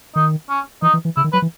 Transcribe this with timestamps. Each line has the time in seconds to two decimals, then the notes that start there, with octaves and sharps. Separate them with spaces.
0.15 D#3 D#4
0.49 C#4
0.82 E3 D#4
0.93 E3
1.05 E3
1.17 C#3 E4
1.24 D#3
1.33 F#3 B4
1.42 E3